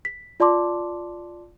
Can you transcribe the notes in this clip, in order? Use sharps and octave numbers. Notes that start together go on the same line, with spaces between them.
B6
F4 D5 A5 C6 D6